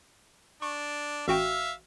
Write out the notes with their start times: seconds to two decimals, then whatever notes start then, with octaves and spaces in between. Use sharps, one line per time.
0.62 D4 C#6
1.28 A1 F#4 E5 F5 G5 E6